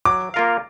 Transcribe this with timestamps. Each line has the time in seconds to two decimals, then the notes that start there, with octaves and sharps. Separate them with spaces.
0.05 F#3 D6
0.34 A#3 F4 A#4 F5